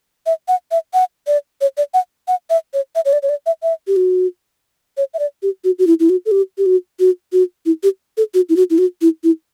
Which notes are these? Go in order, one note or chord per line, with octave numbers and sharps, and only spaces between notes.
E5
F#5
E5
F#5
D5
C#5
D5
F#5
F#5
E5
C#5
E5
C#5
D5
C#5
D5
E5
E5
G4
F#4
C#5
E5
D5
G4
F#4
F#4
E4
E4
F#4
A4
G4
G4
F#4
F#4
F#4
E4
G4
A4
F#4
E4
F#4
E4
F#4
E4
E4